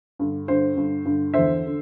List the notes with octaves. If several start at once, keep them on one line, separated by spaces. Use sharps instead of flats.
G2 D3
G2 D3 C5
G2 D3
G2 D3
E2 D3 C5 E5
D3